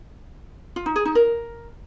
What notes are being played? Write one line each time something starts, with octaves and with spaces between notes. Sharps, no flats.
F4
D#4
G#4
D#4
A#4